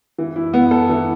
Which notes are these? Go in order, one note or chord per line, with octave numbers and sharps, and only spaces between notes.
E3
E4
B3
A4
E3